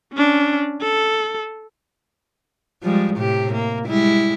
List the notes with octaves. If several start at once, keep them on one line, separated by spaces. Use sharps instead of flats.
C#4 D4
A4
F3 G3 G#3
A2 C3 G4
A#3
G3 G#3 E4